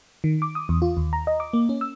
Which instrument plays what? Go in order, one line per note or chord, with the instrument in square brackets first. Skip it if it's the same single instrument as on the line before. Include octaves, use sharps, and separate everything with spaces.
[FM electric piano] D#3
D6
D#6
E2
F4
D#2
A#5
D#5
D6
A#3
C#4
E6